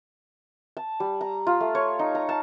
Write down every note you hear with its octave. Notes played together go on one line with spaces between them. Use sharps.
A5
G3
A#5
F4
A3
C#5
D#4
A#5
A5